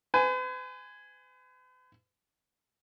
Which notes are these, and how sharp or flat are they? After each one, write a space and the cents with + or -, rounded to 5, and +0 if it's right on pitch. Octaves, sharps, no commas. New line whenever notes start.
B4 +45 G#5 +0